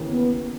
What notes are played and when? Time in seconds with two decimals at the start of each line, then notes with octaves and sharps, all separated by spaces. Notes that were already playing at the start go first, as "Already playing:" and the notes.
Already playing: D#2 C#3 E3 A#3 E4
0.09 B3